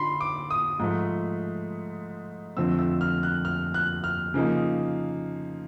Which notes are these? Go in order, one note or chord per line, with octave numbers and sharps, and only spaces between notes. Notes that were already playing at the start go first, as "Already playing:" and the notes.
Already playing: D3 D#4 B5 C6
D6
D#6
G#2 F3 A3
F2 D3 F3 A3 C4 E6
E6
F6
F#6
F6
F#6
F6
C#3 F3 A#3 D#4